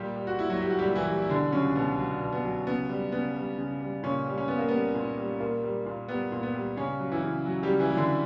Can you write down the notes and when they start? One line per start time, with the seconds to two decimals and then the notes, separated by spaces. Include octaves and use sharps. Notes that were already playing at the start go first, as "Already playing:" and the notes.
Already playing: A#2 G3 G4
0.16 G3
0.27 F#4
0.38 A#2 E4
0.50 F#3 F#4
0.61 G3 G4
0.70 F#4
0.79 G3 G4
0.84 A#2
0.95 E3 E4
1.07 G3
1.22 E4
1.30 B2 D3 D4
1.52 C#3 F#3 C#4
1.75 B2 B3
1.98 F#3
2.21 B2
2.32 B3
2.44 F#3
2.67 C#3 B3
2.89 G3
3.12 C#3 B3
3.35 G3
3.58 C#3
3.81 G3
4.03 A#2 C#3 C#4
4.26 G3
4.38 C#4
4.48 A#2 B3
4.58 A#3
4.68 G3 B3
4.95 A#2
5.18 G3
5.40 A#2 A#3
5.63 G3
5.86 A#2
6.08 G3 B3
6.32 A#2
6.43 B3
6.54 G3
6.77 C#3 C#4
7.00 F#3
7.11 E3 E4
7.23 C#3
7.46 F#3
7.63 G3 G4
7.69 C#3
7.80 E3 E4
7.90 F#3 E4
7.97 D3 D4